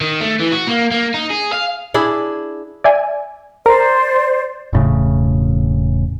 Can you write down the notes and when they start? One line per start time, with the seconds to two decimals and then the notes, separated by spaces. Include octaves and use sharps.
0.01 D#3
0.21 A3
0.40 E3
0.52 F#4
0.68 A#3
0.91 A#3
1.14 D#4
1.30 G#4
1.53 F5
1.94 D4 E4 G#4
2.84 D5 E5 G#5
3.66 A#4 C5 D5 A#5
4.73 E1 A2 C#3